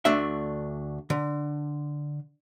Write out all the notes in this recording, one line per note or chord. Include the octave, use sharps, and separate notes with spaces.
D2 A3 D4 E5
D3